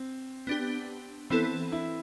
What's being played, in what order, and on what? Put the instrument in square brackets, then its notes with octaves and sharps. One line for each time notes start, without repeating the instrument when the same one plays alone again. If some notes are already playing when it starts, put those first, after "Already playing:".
Already playing: [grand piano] C4
[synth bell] B3 D4 G4
[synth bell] E3 B3 E4 A4 [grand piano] C4
[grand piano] E4